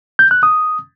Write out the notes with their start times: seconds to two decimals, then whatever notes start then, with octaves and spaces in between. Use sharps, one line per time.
0.19 G6
0.31 F#6
0.43 D#6